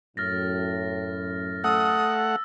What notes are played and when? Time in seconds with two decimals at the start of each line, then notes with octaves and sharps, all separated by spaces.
0.17 F#2 A2 F6 A6 A#6
1.64 A3 F#5 D#6 E6